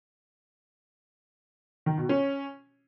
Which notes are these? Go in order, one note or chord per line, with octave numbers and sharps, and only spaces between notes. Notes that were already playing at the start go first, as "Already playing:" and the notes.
D#3
B2
C#4